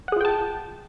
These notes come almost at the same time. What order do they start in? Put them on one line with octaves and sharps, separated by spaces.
F#5 G#4 F4 G5 A5